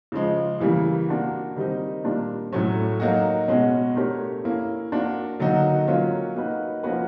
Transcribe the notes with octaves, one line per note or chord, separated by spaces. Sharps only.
C#3 F3 G#3
C#3 E3 G3 A#3
A#3 D4 F#4
D#3 G3 C4 D#4
A#2 G3 A#3 D4
A2 F#3 A3 C#4
F#3 A#3 D#4 F#4
B2 G#3 C#4 F#4
A3 D4 G4 A#4 C#5
A#3 C#4 E4
A#3 D4 F#4
D3 F#3 A#3 D#4 F#4
F#3 A#3 C#4 F4
A#3 D#4 F#4 B4
F3 A#3 C#4 F#4 B4